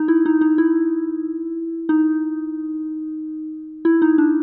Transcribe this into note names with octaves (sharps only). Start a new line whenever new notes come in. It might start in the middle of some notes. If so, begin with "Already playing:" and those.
Already playing: D#4
E4
D#4
D#4
E4
D#4
E4
D#4
D4